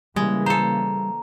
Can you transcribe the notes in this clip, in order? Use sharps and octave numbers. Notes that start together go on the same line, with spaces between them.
C#3 E3 G3 G#3 A#3
A4 C5 A#5